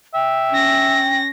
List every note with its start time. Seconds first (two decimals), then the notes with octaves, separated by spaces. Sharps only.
0.14 E5 G5
0.50 C#4 A#6